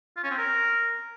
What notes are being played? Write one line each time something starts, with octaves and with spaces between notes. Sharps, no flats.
F4
C#4
C4
A#4